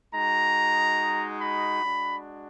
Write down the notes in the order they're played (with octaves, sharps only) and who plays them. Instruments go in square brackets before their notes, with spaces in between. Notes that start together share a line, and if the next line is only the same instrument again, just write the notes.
[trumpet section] G#3 D#4 F#4 A#5
B5
G#3 D4 F#4